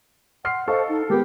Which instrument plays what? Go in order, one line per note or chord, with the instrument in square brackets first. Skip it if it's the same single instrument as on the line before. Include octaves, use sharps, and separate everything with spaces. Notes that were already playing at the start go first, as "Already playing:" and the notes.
[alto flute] F#5 [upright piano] C6 F6 C7
[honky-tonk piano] A4 [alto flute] C5 [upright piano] D#5 F5 C#6
[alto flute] D#4
[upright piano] G#3 B3 [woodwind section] G4 [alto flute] A#4